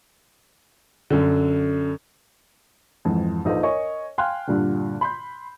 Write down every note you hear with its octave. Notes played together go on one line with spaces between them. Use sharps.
F#2 D3
F2 G#2 E3
A#1 D#4 F4 A4 B4 C5
A#4 C#5 D#5 G#5 C#6
F5 G5 G#5 C6 F6 F#6
G2 A#2 D3
B5 C6 G6